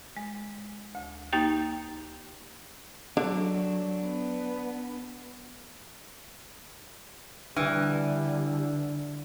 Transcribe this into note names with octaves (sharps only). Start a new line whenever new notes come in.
G#3
D2
A#3 D#4 G4 G5 A6
D3 F#3 D4
B3
D3 E3 G3 D4